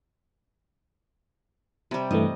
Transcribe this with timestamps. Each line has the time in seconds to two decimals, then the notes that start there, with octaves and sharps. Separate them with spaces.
1.91 C3 G3
2.11 G2 E3 A3 D#5